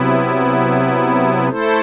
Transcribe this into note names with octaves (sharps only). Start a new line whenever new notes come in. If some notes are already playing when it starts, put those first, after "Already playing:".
Already playing: C3 F#3 B3 E4
A3 E4 A4 C5